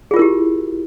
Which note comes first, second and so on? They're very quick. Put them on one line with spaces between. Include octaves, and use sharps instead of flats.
G#4 F4 A#4 E4 G4